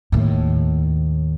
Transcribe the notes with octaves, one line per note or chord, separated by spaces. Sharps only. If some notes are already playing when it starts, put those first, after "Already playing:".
D#2 A2